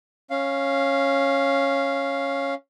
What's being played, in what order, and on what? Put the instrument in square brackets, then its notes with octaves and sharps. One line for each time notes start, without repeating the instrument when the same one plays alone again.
[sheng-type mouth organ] C#4 F5